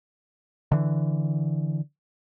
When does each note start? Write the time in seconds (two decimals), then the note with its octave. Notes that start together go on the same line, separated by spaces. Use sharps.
0.72 D3 E3